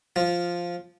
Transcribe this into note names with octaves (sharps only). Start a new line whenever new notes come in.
F3